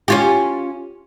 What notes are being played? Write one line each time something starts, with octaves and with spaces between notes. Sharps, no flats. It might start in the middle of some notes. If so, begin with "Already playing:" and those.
C#4 F4 G4